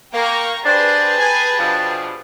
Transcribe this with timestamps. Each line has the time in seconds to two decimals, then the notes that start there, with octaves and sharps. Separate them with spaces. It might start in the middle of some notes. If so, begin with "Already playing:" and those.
0.13 A#3 G5 A#5 C#6
0.65 D4 G4 G#4 B4 C5 A5
1.18 G#5
1.58 B2 F3 D4